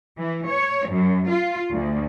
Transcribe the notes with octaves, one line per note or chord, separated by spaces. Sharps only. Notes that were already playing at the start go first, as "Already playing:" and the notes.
E3
C#5
F#2
F4
D2